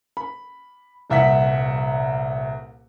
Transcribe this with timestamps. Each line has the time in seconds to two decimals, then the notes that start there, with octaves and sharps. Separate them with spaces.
0.17 B5
1.10 D#1 C2 E5 F#5 B6